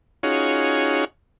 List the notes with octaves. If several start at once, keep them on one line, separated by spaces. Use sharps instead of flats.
C#4 D#4 F4 F#4 G#4 C#5